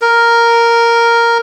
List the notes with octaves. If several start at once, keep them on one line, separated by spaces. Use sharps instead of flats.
A#4